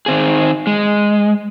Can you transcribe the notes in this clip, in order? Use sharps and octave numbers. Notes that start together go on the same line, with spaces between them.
D#3 C4 G#4
G#3